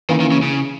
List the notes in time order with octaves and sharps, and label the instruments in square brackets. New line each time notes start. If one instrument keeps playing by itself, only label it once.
[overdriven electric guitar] D#3 [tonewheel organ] E3 A#3 C#4 E4
[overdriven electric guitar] D#3
C#3
C#3